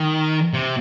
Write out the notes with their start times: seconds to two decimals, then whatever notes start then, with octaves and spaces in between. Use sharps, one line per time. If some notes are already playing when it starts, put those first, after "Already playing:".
Already playing: D#3
0.53 C3